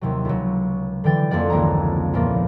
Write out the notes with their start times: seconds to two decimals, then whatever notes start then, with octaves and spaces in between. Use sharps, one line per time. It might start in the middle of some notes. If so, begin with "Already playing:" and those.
0.01 D#2 C3 F#3
0.25 C#2 F#3
1.04 D3 E3 G5 A6
1.30 F2 D3 A#3 D5 F#5
1.50 G#1 C#2 A#3 C4 A#5
2.13 E2 A#2 F3 A#3